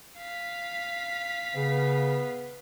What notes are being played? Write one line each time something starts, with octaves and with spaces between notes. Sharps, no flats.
F5 B6
C#3 B3